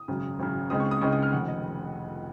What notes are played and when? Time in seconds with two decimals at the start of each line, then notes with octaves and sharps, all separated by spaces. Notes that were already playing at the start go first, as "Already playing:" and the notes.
Already playing: D#6
0.08 G#1 F#2 C#3
0.39 G#1 F#2 C#3
0.70 C#2 C#3 G#3 C4 D#4 D#6
0.80 C#6
0.91 D#6
1.01 C#2 C#3 G#3 C4 D#4 C#6
1.12 D#6
1.23 F6
1.32 F1 F2 D#3 F#5
1.48 D#5